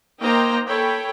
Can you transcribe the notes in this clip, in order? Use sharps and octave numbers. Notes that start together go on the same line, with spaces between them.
A#3 D#4 C5 D#5 G5 A#5
A4 C#5 G5 G#5 B5